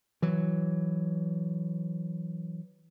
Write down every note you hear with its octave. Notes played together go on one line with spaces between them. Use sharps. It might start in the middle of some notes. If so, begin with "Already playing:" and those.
E3 F#3